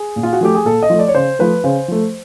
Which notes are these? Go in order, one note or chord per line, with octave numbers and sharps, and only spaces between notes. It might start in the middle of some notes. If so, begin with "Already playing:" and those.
Already playing: G#4
A#2
F4
F#4
F3 A3 G4
G#4
A#2 A4
D#5
F3 A3
D5
C#5
C#3 C5
F3 A3 B4
C#3 C5
F3 A3